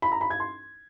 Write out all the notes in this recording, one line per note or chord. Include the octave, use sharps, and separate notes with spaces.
B5
A#5
B5
G#6
C6